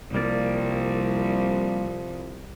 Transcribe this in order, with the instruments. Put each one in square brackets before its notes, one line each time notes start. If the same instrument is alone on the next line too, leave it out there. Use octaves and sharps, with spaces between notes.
[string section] C2 [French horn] F3 [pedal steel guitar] G3 A#3 D5